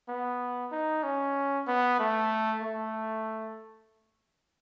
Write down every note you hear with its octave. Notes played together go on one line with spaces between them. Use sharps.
B3
D#4
C#4
B3
A3
A3